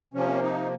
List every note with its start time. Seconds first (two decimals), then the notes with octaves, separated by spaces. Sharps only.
0.14 C3 F3 A#3 C#4
0.42 D#4